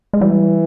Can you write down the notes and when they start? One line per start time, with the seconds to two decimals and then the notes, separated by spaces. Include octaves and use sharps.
0.13 G#3
0.21 E3 G3